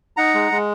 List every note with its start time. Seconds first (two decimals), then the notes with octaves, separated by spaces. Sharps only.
0.17 D#4 F#5 A#5
0.34 G#3
0.52 G#3